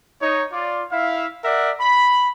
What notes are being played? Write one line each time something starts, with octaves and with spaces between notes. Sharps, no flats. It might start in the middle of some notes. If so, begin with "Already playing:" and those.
D#4 C#5
F4 D5
E4 E5 F5
A#4 D5 E5 F#5
B5